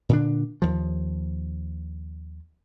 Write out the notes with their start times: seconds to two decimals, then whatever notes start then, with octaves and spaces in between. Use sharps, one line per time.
0.09 A#2 D3 D4
0.62 D#2 F3